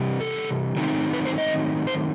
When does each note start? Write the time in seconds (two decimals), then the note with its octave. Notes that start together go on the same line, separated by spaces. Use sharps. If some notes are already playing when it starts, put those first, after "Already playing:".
Already playing: C3 E3 G3
0.21 A4
0.76 D#3 F#3 A3 C4 D#4
1.13 B4
1.25 C5
1.38 D#5
1.87 C5